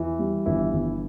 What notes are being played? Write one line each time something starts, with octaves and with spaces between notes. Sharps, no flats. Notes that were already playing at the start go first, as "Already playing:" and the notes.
Already playing: E2 E3
G3
G1 E3 E4
G1